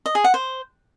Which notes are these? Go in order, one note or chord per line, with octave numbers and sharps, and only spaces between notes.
D#5
G#4
F#5
C5